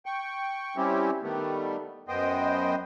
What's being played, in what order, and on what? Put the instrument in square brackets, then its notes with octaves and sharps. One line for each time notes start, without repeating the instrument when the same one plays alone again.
[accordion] G5 C#6
G3 C4 C#4 E4 G4
D#3 G3 A3 B3
F#2 B3 C5 D#5 G5